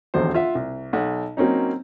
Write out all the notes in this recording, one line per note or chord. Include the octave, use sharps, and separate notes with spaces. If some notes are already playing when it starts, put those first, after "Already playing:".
D#1 A#1 E2 F#3 C5
F4 E5 F#5
C2
B1 F#5
F#3 A#3 C4 C#4 D#4